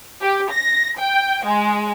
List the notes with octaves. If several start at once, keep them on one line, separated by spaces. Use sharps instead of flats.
G4
A#6
G5
G#3